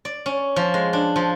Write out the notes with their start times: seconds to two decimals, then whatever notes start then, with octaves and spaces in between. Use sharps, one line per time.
0.05 D5
0.26 C#4
0.56 F3
0.74 G#3
0.93 D4
1.16 F3